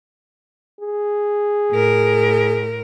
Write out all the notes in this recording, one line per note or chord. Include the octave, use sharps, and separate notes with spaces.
G#4
A2 A#4